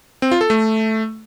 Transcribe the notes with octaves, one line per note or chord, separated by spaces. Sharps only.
C4
F4
A4
A3